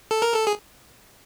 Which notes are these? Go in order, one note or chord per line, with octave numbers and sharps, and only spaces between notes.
A4
A#4
A4
G#4